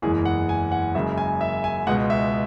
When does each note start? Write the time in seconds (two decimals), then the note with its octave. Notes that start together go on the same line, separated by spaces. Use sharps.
0.02 F#1 E2 E3 G#3 G#4
0.25 F#5
0.49 G#5
0.72 F#5
0.95 F#1 F#2 C#3 G#3 E5
1.18 G#5
1.41 E5
1.64 G#5
1.87 C#2 B2 G#3 F#5
2.10 E5